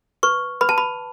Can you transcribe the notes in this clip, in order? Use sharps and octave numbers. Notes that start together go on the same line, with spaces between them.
B4 C#6
B4 B5
A5
B5